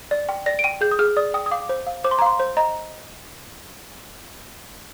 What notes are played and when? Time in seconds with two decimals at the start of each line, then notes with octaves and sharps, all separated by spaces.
0.11 D5
0.29 G5
0.46 D5 A#6
0.59 D7
0.64 G5 D#7
0.81 G#4 G6
0.91 D#6
0.99 G#4 F6
1.17 D5 D#6
1.34 G5 D#6
1.46 D#6
1.51 F5 D6
1.69 C5
1.87 F5
2.04 C5 D6
2.11 C6
2.19 A#5
2.22 F5 C6
2.40 C5
2.57 D#5 A#5